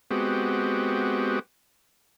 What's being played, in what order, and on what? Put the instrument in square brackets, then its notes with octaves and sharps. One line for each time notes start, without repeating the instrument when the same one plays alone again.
[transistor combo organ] G#3 B3 C4 F#4 G4